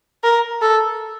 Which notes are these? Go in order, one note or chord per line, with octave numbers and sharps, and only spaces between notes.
A#4
A4